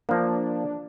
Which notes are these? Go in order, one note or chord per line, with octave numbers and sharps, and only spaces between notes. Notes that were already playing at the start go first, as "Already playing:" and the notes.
F3 A#3 D4